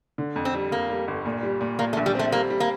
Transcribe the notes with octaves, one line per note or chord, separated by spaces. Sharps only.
D3
F2
C4
G3
F2 A#3
G3
G1
A#2
G3
A#2
A#2 A#3
A3
A#1
G3
A3 C4
G3 A#3
G3
A#3